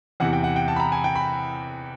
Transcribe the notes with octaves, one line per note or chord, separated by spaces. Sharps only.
E2 C3 E3 F#5
G5
F#5
G5
A5
B5
A#5
G#5
G5
B5